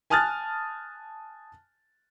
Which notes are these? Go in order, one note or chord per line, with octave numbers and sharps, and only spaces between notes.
G#5 A5 D#6 F6 F#6 A6